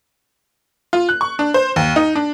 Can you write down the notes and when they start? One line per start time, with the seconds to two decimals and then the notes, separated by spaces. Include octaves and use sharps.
0.93 F4
1.09 F#6
1.21 C#6
1.39 D4
1.54 C5
1.76 D#2
1.96 D#4
2.16 D4